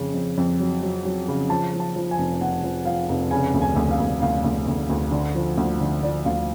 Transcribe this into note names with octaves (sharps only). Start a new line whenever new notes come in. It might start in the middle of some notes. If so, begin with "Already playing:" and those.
Already playing: F2 C#3
F2
F2
F#3
F#3
F#3
C#3
F3 A5
F3
A5
F3
G#5
F1
F1 F#5
F3
F3 F5
F1
C#3 G#5
D2
G#5
D2
F5
D2
D2 F5
D2
D2
D2
D3
F3
D2
D3
F3 D5
D2 F5